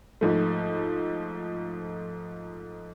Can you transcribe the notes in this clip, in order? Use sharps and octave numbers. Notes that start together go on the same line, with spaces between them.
G#2 F3 A3